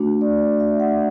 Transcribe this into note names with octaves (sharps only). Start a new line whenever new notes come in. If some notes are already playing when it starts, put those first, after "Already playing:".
Already playing: A3 D4 F#4
D5
E5
F#5